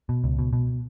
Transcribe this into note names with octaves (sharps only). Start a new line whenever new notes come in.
B2
C#2
B2
B2